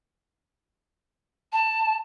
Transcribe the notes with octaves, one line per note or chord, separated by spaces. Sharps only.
A5